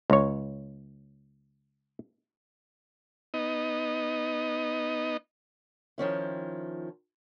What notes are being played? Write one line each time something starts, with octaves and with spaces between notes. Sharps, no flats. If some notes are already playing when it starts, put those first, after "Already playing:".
C#2 C#5
B3 D#4 D#5
D#3 F3 C#4 E4